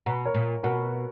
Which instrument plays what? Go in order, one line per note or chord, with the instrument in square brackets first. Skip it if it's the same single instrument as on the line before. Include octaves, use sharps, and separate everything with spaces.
[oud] B2 [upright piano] F#5 A#5
[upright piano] A#4 C#5
[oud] A#2
[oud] B2 [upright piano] F#4 A#4